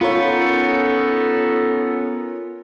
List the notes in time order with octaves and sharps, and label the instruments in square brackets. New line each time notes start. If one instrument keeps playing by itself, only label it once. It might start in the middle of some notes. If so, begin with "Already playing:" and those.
[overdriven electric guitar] B3 [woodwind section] C#4 D#4 A4 [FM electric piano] F4 A#4 C#5